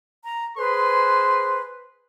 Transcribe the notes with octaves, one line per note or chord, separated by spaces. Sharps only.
A#5
G#4 B4 C5 C6